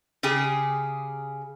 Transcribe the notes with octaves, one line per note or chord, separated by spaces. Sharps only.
C#3 G4 G#4